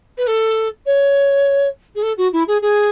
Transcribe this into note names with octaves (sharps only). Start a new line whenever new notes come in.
B4
A4
C#5
G#4
A4
F#4
E4
G#4
G#4